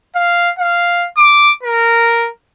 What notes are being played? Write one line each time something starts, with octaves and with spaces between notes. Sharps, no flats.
F5
F5
D6
A#4